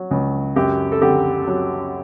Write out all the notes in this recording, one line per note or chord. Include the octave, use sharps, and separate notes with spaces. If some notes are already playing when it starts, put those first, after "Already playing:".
Already playing: F#3
C#2
F#2 G4
A4
D3 G4
F#3